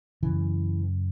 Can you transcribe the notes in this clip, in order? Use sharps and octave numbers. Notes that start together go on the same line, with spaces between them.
F#2 C#3 E3